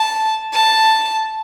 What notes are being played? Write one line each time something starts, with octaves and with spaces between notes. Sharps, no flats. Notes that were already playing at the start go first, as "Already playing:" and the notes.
Already playing: A5
A5